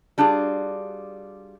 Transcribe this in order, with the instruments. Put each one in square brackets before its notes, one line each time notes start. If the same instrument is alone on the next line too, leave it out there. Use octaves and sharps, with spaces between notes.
[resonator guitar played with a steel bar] G3 D4 F4 F#4 G#4